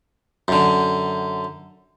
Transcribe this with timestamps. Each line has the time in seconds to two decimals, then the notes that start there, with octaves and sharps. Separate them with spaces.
0.48 F#2 D3